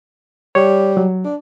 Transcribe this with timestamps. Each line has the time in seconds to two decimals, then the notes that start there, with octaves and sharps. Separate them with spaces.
0.55 G3 C#5
0.97 F#3
1.25 D4